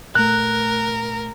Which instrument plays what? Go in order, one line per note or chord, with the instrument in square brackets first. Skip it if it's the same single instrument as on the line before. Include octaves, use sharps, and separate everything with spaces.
[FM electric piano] A#2 A3 [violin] A#4 [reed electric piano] F#6